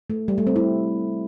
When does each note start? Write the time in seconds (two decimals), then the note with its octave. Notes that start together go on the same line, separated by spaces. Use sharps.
0.10 A3
0.28 G3
0.38 A3
0.47 C4
0.56 E4